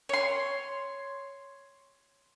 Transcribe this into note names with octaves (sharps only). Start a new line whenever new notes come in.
C#5 C6